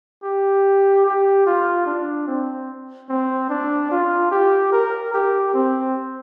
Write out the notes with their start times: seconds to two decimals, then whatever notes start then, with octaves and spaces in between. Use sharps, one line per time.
0.24 G4
1.06 G4
1.47 F4
1.86 D4
2.28 C4
3.09 C4
3.50 D4
3.91 F4
4.32 G4
4.72 A#4
5.14 G4
5.54 C4